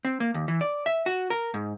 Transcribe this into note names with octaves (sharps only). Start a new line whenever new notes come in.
C4
A#3
D#2
E3
D5
E5
F#4
A#4
G#2